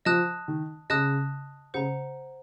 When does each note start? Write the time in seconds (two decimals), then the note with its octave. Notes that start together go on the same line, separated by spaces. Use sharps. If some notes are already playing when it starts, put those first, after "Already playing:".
0.05 F3 D#5 A5 D#6 F#6
0.48 D#3
0.90 C#3 D#5 A5 D#6 F#6
1.74 C#3 C5 F#5 A#5